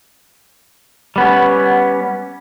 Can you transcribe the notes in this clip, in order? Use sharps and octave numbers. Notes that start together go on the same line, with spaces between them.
G3 B3 C#4